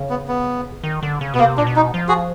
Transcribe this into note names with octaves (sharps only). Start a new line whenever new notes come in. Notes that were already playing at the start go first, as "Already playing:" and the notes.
Already playing: C#3
B3
B3
D#3
D3
C#3
B2 B3
C3 A#3
A#2 D4
B2
D#4
F3
F#4 G#4